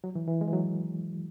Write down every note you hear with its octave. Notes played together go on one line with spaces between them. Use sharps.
F#3
E3
E3
G#3
E3
F#3